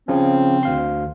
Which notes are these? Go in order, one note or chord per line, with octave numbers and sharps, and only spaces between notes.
C#3 F3 C4 C#4
D2 F5 C6